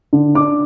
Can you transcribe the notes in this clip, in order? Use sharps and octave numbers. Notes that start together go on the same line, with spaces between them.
D3
D4 D6